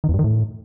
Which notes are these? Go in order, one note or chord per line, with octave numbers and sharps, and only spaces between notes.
D#3
E2
G2
D#3
A2